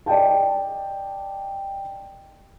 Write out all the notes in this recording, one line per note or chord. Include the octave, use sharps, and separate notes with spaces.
D5 D#5 G5 A5